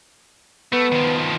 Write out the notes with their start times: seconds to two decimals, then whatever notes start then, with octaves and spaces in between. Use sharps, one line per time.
0.72 A3 B3
0.92 D#3 F3